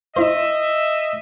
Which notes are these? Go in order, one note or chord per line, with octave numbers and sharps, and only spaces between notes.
D#4 E4 C5 D#5 E5